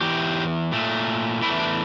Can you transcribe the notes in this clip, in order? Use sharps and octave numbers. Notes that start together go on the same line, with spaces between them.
E2 E3 G4
A#2 A3
E2 E3 A3 E4
D4